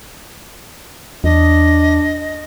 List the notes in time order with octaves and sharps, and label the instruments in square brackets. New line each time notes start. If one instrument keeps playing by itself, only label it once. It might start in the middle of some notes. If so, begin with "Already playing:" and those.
[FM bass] E2 [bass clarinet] D4 [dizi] D#5